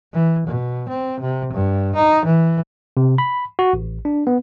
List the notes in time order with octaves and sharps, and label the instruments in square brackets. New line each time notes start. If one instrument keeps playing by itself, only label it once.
[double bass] E3
B2
C4
C3
G2
D#4
E3
[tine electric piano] C3
B5
F#4
A1
D4
B3